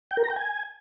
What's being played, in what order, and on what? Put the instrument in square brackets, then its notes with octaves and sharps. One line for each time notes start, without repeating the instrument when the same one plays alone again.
[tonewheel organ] G5
A#4
A#5
G5
G#5